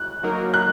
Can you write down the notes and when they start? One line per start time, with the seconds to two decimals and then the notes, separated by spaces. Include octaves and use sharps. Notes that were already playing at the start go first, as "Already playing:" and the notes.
Already playing: F#6
0.23 F#3 A#3 D#4 F#4 A#4
0.54 F#6